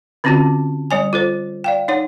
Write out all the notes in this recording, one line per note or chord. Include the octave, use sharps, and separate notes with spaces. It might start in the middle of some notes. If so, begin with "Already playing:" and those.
D3 C4 C#4 F4 F#4 A5
G3 C#5 G#5
F4 A4 C5
D5 F5 G5
D#4 C#5 F#5